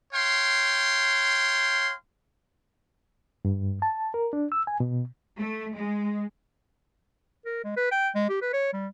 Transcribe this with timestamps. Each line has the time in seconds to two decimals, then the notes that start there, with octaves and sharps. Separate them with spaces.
0.14 C#5 F5 G5 C6
3.45 G2
3.82 A5
4.14 A#4
4.33 D4
4.52 E6
4.67 G#5
4.80 B2
5.38 A3
5.75 G#3
7.46 A#4
7.64 G#3
7.77 B4
7.91 G5
8.15 G#3
8.29 G4
8.41 B4
8.53 C#5
8.73 G3